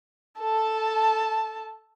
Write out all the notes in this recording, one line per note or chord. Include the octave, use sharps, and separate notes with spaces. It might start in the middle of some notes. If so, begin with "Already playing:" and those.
A4 A5